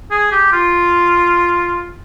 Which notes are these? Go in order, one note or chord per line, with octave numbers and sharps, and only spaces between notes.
G#4
G4
F4